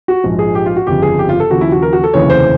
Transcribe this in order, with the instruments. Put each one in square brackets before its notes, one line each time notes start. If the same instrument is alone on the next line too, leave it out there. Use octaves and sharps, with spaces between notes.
[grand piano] F#4
A#1 G#2 F3
G#4
G4
F4
F#4
G1 F2 C#3 F3 G4
G#4
G4
F4
A4
D#2 C#3 F3 F#4
E4
F#4
A#4
F#4
A4
F1 D#2 C#3 E3 C#5
C5